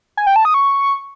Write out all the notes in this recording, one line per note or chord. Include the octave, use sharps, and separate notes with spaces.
G#5
G5
A5
D#6
C#6